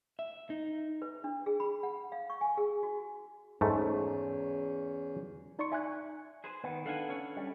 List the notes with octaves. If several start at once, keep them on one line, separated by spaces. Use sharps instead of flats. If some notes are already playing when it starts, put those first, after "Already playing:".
E5
D#4
B4
D4
G#4
B5
F#5
F5
C#6
G#5
G#4
F#4
E2 G#2 A3 C#4
D#4 D5 C6 C#6 C#7
E5 G#5 C6 F#6 G#6
G#4 B4 C5
D#3 B3
D4 A4 F5 F#5 G#5
C#4 C#5
C#4
G3